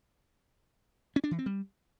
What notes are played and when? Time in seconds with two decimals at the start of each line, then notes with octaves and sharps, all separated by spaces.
1.16 C#4
1.24 D4
1.31 E3
1.39 C4
1.46 G3